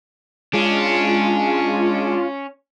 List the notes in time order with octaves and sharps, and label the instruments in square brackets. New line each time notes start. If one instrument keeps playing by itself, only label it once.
[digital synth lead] G#3 [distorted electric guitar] C#4 [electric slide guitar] D4 [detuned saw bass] F4